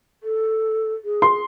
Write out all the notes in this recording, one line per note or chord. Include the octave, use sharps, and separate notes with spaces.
A4
G#4
C6